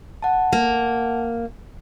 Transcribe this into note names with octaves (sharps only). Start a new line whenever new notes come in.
F#5 A5
A#3